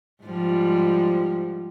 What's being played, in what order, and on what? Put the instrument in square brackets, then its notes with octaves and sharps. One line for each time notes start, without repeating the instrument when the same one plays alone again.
[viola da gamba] G#2 F3 G3